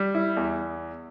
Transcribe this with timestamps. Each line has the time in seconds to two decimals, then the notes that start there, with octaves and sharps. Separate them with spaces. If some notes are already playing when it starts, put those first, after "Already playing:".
Already playing: G3
0.15 E4
0.37 E2